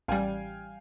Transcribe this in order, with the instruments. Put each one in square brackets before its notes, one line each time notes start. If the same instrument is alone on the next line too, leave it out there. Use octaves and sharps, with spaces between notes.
[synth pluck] A1 G3 [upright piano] F5 G5 G#5